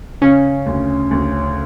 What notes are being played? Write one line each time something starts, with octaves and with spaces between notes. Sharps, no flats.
C#3 C#4
D2
D2